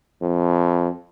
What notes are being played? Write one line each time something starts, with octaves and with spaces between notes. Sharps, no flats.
F2